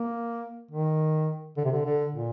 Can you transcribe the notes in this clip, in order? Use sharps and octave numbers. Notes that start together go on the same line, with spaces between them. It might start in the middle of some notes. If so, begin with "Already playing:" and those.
Already playing: A#3
D#3
D3
C3
D3
D3
A#2